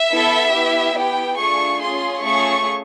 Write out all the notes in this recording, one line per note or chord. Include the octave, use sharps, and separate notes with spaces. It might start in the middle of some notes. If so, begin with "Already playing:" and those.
Already playing: E5
B3 E4 A4
B3 E4 G4
B3 E4 G4 G5
A3 D4 F4 G#4 C#6
C#4 F4 G#4 C6
A3 C#4 F4 G#4 C#6